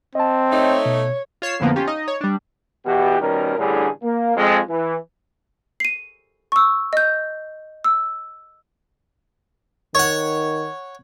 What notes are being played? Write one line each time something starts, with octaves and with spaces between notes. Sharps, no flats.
C4 D#5 A5
A3 D#4 C#5
B2
F4 C#5 C7 E7
F2 A2 D3 F3 A#3 B3
C#4 F4 G4
D#4 D#5
C#5
G3 D4
E2 B2 E3 F#4 G4
B2 D#3 G3 C#4 A#4
A1 A2 D3 G3 D4 G#4
A#3
F2 G#3
E3
C7 D#7
C#6 E6
D#5 G6
E6
D#3 C#5 F#5